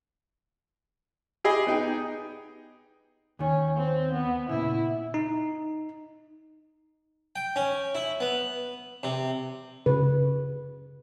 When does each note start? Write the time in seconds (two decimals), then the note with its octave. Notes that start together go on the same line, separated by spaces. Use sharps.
1.44 G4 G#4 D#5 B5
1.67 B3 D#4 G5
3.39 D#2 D#3 C#4
3.77 C4
4.13 B3
4.49 A#2 C#3 E4
5.14 D#4
7.36 G5
7.56 C#4
7.95 E4
8.20 B3
9.03 C3
9.86 C#3 B4